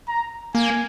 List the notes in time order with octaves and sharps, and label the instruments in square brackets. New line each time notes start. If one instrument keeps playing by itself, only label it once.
[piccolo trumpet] A#5
[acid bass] A#3 [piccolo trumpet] G#5